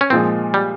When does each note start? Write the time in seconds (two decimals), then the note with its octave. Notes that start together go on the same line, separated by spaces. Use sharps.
0.01 C#4
0.10 A#2 F3 G#3 C4
0.54 G3